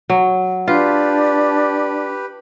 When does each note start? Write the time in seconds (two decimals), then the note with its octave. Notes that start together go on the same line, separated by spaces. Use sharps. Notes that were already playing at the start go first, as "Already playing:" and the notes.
0.10 F#3
0.68 D4 F4 G4 B4